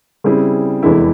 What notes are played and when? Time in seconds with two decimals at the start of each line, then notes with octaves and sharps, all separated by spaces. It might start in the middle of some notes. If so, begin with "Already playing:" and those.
0.24 C#3 G3 C4 E4 G#4
0.83 F1 E2 E3 G#3 E4